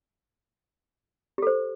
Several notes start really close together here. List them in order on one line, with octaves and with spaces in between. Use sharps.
G4 A4 C5